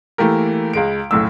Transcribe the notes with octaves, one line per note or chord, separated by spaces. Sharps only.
E3 A3 A#3 G4 A#4
C#2 G#3 D7
F#1 B1 A2 E6